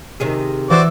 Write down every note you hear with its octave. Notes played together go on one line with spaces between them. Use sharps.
C3 D#3 G#4
E3 F#4 C5 D5 E6